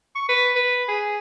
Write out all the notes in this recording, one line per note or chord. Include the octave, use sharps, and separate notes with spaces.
C#6
B4
B4
G#4